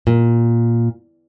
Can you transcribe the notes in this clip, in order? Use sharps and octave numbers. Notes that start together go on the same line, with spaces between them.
A#2